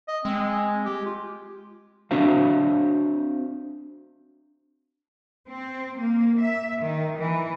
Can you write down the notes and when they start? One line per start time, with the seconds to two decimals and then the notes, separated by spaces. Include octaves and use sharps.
0.08 D#5
0.25 G#3 C4
0.86 G4
1.06 F4
2.11 C4 D4 F#4 C5 E5 F5
5.49 C4
5.98 A#3
6.40 E5
6.81 D#3
7.18 E3